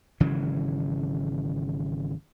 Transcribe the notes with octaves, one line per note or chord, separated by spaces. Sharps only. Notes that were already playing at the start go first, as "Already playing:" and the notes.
G#1 C#3 E3 F#3